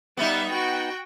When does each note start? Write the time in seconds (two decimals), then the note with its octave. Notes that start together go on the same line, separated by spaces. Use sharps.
0.17 G3 B3 D#4 E5
0.51 F#4 G5